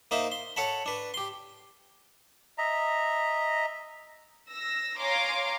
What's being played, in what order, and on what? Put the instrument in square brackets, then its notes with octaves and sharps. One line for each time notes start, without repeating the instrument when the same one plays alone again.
[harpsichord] A#3 D#4 C5 E5
C6
A4 C#5 F#5 A5 B5
D4 B4
G4 C6
[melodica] D#5 E5 A#5
[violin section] E6 A#6
C#5 F5 G#5 A#5 C6 D6